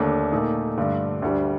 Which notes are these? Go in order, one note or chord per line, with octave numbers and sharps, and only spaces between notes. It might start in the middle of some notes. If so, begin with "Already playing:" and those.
Already playing: D#2 D3 A3 D4
A#2 A3 D#4
G2 D3 A3
D2 D3 G3